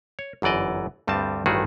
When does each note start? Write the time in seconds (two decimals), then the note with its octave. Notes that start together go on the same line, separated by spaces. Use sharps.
0.19 C#5
0.42 G1 F#2 E3 D5 D#5
1.07 D2 G2 G3 C4 A5
1.46 A1 G2 D#3 A3 F#4 G#4